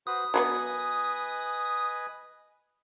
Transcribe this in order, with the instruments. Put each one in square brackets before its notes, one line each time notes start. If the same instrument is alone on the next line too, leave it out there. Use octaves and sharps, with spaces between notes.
[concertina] F#4 B4 C5 [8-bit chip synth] D#6
[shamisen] F#3 G3 B3 [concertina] B4 D#5 G#5